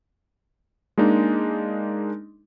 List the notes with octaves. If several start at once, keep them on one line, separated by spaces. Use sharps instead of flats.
G#3 A#3 D4 D#4